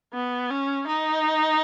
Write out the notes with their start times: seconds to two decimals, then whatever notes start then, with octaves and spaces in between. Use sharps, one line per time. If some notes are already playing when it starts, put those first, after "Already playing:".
0.13 B3
0.50 C#4
0.87 D#4